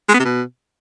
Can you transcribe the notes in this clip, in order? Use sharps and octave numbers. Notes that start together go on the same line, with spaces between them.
G#3
B3
C3
B2